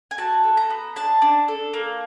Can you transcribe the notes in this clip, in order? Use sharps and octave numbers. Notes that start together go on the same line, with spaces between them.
G#5
F#4 A5
A4
A#5
B3
D4 A5
D4
A4
A#3